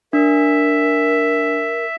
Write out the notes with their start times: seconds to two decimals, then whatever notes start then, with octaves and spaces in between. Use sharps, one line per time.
0.13 D4 A#4 E5